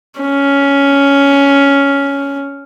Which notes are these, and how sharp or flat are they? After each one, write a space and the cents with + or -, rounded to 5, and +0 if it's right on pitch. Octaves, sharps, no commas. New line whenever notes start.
C#4 +10